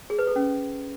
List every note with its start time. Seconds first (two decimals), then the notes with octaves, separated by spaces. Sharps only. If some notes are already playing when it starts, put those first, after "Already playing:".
0.10 G#4
0.19 B4
0.27 A4
0.36 C#4